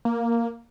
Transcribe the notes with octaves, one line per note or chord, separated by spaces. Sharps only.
A#3